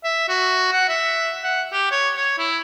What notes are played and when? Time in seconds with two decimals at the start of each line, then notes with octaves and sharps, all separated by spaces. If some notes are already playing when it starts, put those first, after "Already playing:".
0.04 E5
0.29 F#4
0.72 F#5
0.89 E5
1.44 F#5
1.72 G4
1.92 C#5
2.16 C#5
2.38 E4